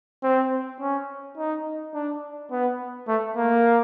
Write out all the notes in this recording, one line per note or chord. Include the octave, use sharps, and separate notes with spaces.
C4
C#4
D#4
D4
B3
A3
A#3